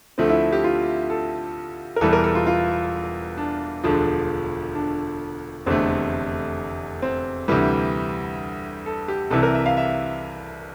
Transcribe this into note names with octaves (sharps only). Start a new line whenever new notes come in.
D2 D3 F3 A3 C4
E4
G4
F4
A4
A#4
E1 E2 E3 G3 A4
A#4
A4
F4
F4
D4
E1 D2 D3 F3 D4
D4
F1 E2 D3 A3 C4
C4
D2 C3 E3 G3 G4
A4
G4
C2 C3 E3 A4
A#4
E5
F5
E5